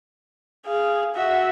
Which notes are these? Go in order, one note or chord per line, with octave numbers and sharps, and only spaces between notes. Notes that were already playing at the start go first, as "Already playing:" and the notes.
G#4 F5
F#4 E5